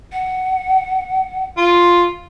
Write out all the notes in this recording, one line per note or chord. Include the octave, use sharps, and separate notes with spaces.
F#5
F4